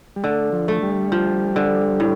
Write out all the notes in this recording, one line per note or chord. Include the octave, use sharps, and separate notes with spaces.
G3
D3 A3
F3
A3
G3
F3
D3
A2